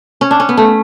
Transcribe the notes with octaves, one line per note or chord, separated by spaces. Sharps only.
C#4
D4
C#4
B3
A3